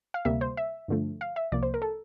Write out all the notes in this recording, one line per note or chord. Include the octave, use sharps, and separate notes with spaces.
F5
D2 C3 G3 A#3 E5
C5
E5
G2 D3 F3 A3
F5
E5
C2 C3 F3 A#3 D5
C5
A#4
A4